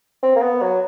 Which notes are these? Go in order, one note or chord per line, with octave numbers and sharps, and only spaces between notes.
C4
A#3
B3
F#3